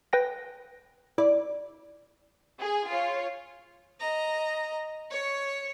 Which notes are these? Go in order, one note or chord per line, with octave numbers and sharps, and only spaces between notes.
B4 G5 A#6
E4 D5
G#4 G#5
F4 C#5
D#5 A#5
C#5 C#6